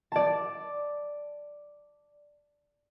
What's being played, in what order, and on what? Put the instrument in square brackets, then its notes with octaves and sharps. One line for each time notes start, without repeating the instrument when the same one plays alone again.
[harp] D5 A5